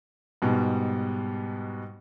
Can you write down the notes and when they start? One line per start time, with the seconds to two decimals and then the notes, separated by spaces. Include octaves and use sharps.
0.42 G#2 B2 G3